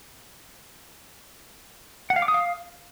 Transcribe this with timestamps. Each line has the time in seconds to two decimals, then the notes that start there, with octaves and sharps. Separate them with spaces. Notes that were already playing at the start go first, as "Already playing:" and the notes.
2.10 F#5
2.16 F5
2.22 D6
2.28 D#6
2.34 F5